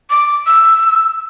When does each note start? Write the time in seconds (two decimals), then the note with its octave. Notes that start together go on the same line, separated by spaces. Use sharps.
0.10 D6
0.46 E6